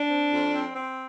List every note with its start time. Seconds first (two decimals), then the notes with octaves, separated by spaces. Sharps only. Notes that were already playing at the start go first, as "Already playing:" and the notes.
Already playing: D4
0.09 C4
0.31 F2
0.52 C4
0.74 C4